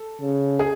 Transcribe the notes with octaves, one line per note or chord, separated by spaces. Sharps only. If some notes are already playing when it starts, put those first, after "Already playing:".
Already playing: A4
C#3
G#4